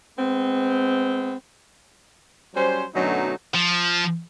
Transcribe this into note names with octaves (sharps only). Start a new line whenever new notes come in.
G#3 B3 C4
F#3 G3 C#4 C5
F#2 B2 D3 F#3 A3 D#4
F3